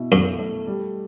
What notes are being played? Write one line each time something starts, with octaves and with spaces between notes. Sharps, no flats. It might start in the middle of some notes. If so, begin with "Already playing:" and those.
Already playing: B2 E4
F#2 A4
A3
G3